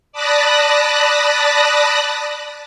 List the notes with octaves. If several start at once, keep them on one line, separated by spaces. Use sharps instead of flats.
D5 A5 B5 D#6 F#6 A#6